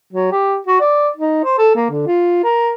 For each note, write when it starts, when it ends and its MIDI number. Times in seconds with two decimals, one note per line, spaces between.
0.13 0.29 54
0.32 0.57 67
0.67 0.79 66
0.80 1.09 74
1.16 1.39 63
1.44 1.56 72
1.58 1.71 69
1.75 1.86 58
1.90 2.05 50
2.06 2.41 65
2.44 2.73 70